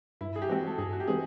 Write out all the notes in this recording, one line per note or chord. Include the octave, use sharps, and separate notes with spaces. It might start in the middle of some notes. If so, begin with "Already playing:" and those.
G2 E4
G#4
G4
E3 G#3 C4 F#4
A4
G2 G#4
F#4
G4
E3 G#3 C4 G#4